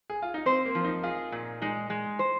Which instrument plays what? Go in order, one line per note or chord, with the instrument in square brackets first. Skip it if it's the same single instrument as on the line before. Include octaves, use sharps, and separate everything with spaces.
[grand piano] G#4
F4
D#4
[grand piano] C4 [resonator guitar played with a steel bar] C5
[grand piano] A#3
[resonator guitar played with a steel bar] F3
[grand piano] D#4
[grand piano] F4 [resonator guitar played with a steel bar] G#4
[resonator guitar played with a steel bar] A#2
[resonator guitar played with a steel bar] G#3 [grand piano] D#4
[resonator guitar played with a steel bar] G#3
C5